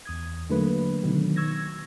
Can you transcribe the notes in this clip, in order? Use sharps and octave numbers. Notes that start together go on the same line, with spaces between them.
E2 D#6 G#6
D3 F#3 A3 A#3 B4
B2 D3 D#3 F#3
C#6 E6 G#6 A#6